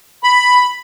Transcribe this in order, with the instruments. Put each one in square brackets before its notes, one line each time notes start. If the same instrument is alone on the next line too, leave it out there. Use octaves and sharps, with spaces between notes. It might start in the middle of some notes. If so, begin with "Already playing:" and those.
[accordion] B5